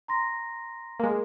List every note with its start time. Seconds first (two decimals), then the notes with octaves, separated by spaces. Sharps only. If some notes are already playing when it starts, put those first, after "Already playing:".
0.08 A#5 C6 A#6
1.00 G#3 A#3